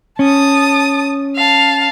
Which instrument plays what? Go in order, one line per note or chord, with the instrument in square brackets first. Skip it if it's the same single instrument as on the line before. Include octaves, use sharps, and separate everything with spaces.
[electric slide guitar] C#4 [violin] A5 D#6
[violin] F5 A5